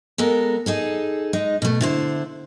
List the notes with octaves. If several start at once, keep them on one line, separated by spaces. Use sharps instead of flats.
G#3 B3 A4 A#4
D#4 G#4 A4
G#3 D#4
B2 A3
D3 E4 C5